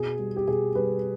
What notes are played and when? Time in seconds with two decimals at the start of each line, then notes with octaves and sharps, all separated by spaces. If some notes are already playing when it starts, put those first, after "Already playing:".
Already playing: B2 G#4
0.19 G3
0.36 G4
0.48 B2 G#4
0.75 G3 B4